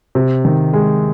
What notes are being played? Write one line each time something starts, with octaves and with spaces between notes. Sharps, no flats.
C3
D#3
G#3